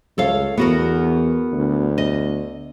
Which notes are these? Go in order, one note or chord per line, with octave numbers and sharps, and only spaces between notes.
C#2 A4 C#5 F5
E2 B3 F#4 A#4
D2
D#5